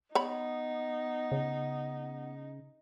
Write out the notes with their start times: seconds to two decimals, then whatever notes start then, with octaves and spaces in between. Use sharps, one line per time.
0.15 B3 D#4 C#5 B5
1.32 C#3